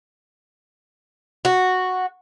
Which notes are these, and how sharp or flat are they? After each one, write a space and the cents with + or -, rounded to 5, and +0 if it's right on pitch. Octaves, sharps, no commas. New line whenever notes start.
F#4 -5